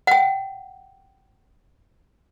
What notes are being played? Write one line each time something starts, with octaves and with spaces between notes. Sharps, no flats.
F#5 G5